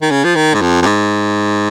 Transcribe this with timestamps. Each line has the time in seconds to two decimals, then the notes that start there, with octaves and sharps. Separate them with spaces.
0.02 D#3
0.11 C#3
0.24 F3
0.35 D#3
0.54 G#2
0.61 F2
0.82 F2
0.86 G#2